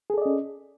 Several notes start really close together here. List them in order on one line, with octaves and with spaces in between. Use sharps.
G#4 A4 D5 D#5 C#4